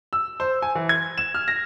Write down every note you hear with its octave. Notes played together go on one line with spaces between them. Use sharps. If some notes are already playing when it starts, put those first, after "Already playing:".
E6
C5
G#5
E3
G#6
E7
F6
A#6